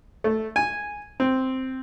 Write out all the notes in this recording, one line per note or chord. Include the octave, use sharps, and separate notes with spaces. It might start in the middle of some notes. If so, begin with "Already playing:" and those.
A3
G#5
C4